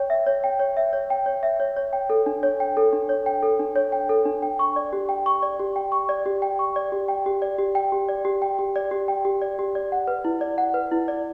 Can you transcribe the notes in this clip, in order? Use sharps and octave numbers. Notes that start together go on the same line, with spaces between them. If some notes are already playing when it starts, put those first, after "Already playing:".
Already playing: C#5 G5
E5
C#5
G5
C#5
E5
C#5
G5
C#5
E5
C#5
C#5
G5
A4
D4
C#5
G5
A4
D4
C#5
G5
A4
D4
C#5
G5
A4
D4
G5
C#6
D5
G4
G5
C#6
D5
G4
G5
C#6
D5
G4
G5
C#6
D5
G4
G5
G4
D5
G4
G5
G4
D5
G4
G5
G4
D5
G4
G5
G4
D5
G4
D5
F#5
B4
E4
D5
F#5
B4
E4
D5